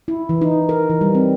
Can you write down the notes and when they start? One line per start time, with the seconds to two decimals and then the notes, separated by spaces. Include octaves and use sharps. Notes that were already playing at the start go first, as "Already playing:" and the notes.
0.08 E4
0.29 E3
0.41 D#4
0.69 A#4
0.90 E3
1.01 G3
1.15 C4